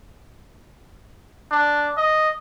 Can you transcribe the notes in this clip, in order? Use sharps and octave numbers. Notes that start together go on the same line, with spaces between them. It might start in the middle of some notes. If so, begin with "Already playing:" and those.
D4
D#5